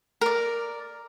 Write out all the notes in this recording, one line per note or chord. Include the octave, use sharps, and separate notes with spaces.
A#4 D5